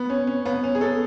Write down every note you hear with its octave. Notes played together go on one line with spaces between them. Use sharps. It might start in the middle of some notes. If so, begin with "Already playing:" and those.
Already playing: B3
C#4
C#4
B3
C#4
G#4
A4